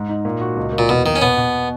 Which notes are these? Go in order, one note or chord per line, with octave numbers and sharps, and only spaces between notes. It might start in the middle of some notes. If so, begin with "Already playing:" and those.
Already playing: G#2
D#4
A#2
F#4
C#2
A#3
A#2
E2 B2
D#3 A#3
C#4
B2 B3
B2